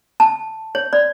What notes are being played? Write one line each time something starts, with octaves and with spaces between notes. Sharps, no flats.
A5
C#5
D5